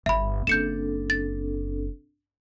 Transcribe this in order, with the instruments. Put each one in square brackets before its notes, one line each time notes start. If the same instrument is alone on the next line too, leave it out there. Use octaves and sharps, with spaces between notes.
[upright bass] G1 [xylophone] E5 B5
[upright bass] F#1 [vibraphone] C4 D4 A4 [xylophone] G6 C#7 E7
[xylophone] A6